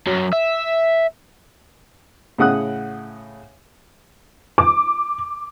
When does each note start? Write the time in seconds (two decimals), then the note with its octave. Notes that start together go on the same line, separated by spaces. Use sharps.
0.07 F#2 F#3
0.33 E5
2.38 A2 C#3 F#5 D#6 F#6
4.58 D6